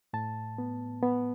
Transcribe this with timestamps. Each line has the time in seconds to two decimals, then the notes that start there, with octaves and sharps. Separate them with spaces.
0.13 A2 A5
0.58 B3
1.03 B3